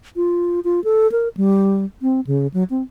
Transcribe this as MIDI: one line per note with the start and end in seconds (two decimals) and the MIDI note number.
0.16 0.60 65
0.64 0.83 65
0.84 1.10 69
1.12 1.28 70
1.37 1.85 55
2.02 2.20 60
2.27 2.47 49
2.54 2.64 54
2.70 2.82 60